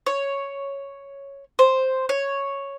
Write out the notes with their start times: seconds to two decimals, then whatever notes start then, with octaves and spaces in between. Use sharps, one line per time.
0.06 C#5
1.59 C5
2.09 C#5